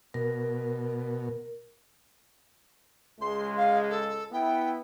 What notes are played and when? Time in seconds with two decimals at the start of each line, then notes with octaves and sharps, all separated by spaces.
0.14 B2 A#4
3.21 C#2 G#3 C6
3.57 F5
3.90 A4
4.32 B3 E4 G5